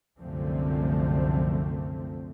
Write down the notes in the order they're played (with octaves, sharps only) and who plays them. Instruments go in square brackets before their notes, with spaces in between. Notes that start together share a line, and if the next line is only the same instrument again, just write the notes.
[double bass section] C2 F#2 D3 F3 A3 C4